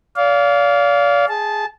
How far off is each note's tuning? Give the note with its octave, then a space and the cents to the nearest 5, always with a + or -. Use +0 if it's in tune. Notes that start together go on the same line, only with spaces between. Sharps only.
D5 -35 F5 +0
G#4 +0 A5 -15